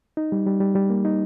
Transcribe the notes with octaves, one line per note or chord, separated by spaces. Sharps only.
D#4
G3
G3
G3
G3
A#3
D#4